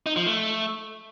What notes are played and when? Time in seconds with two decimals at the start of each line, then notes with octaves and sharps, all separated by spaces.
0.06 D#4
0.16 F3
0.26 A3